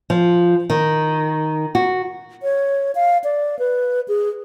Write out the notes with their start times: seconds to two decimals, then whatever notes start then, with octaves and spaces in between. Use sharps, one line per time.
0.10 F3
0.70 D#3
1.75 F#4
2.43 C#5
2.95 F5
3.24 D5
3.59 B4
4.08 G#4